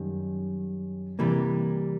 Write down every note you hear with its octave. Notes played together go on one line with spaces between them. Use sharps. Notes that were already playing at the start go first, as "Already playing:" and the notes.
Already playing: F#2 D#3 G3
C3 E3 G3 A#3